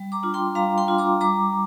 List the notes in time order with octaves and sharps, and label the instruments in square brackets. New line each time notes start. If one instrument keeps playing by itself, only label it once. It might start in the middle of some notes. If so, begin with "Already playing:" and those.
Already playing: [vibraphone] G3
A#5 D6
D4 F4
G5 C6
G3 F5 A#5
G5 C6
D4 F4
A#5 D6
G3 A#5 D6